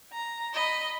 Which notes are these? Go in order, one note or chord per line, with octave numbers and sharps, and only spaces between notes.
A#5
D#5 B5